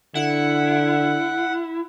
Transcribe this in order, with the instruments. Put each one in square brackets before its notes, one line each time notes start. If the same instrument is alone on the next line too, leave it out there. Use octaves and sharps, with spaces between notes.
[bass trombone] D3 [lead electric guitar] E4 [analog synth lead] F#5